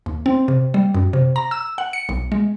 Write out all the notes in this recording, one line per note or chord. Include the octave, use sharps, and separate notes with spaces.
D#2
C4
C3
G3
F#2
C3
A#5
E6
F#5
C#7
B1
G#3